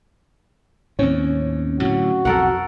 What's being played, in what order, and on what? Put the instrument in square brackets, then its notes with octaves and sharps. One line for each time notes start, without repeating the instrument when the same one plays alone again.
[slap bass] D#2 A2 [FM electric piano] C4 C#4 C#5
[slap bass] A2 D3 F#3 [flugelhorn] F#4
[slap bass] B1 F2 [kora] A4 A#4 F#5